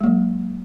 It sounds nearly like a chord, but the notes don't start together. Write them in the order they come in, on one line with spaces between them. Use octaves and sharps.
G#3 A#3 F#3